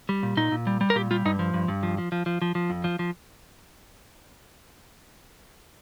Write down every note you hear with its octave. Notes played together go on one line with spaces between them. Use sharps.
G3
A#2
A#2 D#4
A#2
G3
G3
A#4
A#2 G4
G3 F4
G2 D#4
F3
G2
G2
F3
F3
F3
F3
F3
F3
F2
F3
F3